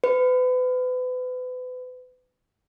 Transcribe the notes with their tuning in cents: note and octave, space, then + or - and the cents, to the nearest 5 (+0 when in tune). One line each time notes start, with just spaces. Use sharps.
B4 +35